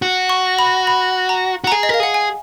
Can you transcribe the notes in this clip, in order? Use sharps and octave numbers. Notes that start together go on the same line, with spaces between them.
F#4
C#6
B5
B5
A#5
F#4
A#5
G#4 G#5
D#5
A#4 F5
G#4 F#5
G#5